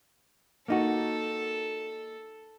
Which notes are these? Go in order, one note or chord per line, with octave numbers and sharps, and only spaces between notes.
A#3 D#4 F#4 A4